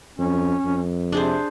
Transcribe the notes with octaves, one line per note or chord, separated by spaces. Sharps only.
F2 C#4
F2
C3 D4 G#4 C5